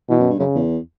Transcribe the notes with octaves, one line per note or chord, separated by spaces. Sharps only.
B2 E3
F#2
G2
F#2 C#3
E2